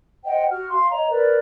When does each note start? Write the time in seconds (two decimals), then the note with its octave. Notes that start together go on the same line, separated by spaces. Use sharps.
0.25 C5 D#5 F#5 G5
0.51 F#4 F6
0.69 F5 C6
0.91 C#5 D#5 A#5
1.09 A#4 B4 D5